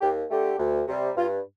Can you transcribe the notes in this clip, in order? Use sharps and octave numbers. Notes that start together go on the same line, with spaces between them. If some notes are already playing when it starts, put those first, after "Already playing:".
D#2 G4
D3 A3 G4
D2
C3 G3
G2 F4